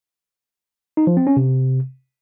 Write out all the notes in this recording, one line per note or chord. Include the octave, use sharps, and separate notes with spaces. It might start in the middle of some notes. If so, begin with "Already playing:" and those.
D#4
F3
C4
C#4
C3